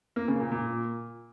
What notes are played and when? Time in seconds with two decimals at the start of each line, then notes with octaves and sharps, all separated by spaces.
0.16 A#3
0.28 C#3
0.40 A#2
0.52 A#2